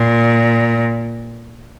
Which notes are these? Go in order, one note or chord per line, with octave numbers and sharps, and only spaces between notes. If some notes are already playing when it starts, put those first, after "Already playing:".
Already playing: A#2